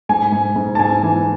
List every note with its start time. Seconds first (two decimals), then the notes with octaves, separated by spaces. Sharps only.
0.09 G#2 G#5
0.32 G#2
0.56 G#2
0.75 A5
0.79 G#2 G#5
1.03 E3